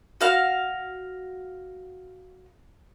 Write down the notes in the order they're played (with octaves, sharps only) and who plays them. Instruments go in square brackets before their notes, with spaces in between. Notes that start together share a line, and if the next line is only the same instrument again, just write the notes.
[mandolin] F#4 F5 F6